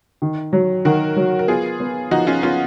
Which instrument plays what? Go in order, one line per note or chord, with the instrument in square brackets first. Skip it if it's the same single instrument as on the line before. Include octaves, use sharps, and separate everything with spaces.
[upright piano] D#3
F#3
[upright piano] D#3 [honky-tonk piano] F#4 A#4
[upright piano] F#3
[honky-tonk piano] A#4
[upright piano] B3 [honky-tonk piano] F4 G#4
[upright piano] B3
[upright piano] F3 [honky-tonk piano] D#4 F#4
[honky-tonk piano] C#4 F4
[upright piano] B3 [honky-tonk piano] C#4 F4